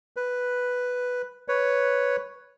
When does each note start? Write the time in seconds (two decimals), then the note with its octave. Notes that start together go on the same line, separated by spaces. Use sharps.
0.16 B4
1.48 B4 C#5